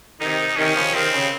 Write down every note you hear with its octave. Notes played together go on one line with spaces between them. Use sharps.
C3 D#3 D#4
C3 D#3 C#4
C#3 F3
C3 D#3 C4
C#3